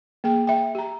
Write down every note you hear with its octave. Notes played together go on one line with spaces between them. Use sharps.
A#3 G#4 G5
E5 G5
G4 A#5